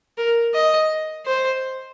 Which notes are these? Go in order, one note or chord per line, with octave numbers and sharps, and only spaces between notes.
A#4
D#5
C5